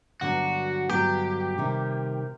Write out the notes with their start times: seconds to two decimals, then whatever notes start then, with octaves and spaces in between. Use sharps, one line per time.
0.21 G2 D3 F#3 B3 F#4
0.89 G2 D3 F#3 B3 G4
1.58 C3 D#3 G3